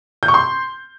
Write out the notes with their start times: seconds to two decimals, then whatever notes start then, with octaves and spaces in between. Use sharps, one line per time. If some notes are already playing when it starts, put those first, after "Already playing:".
0.23 G6
0.28 C#6
0.34 C6